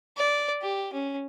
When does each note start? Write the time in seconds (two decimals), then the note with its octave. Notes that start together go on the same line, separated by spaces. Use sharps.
0.17 D5
0.62 G4
0.93 C#4